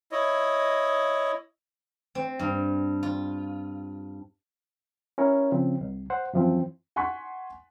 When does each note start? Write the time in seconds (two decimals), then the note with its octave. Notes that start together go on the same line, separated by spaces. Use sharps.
0.12 E4 C#5 D#5
2.15 C4
2.39 G2
3.03 F4
5.18 C#4 E4 A#4 C#5
5.52 C#3 F3 C4
5.81 C2
6.10 C5 F#5
6.33 F#2 E3 F3 C4
6.96 F#5 G#5 C6 C#6 F#6 B6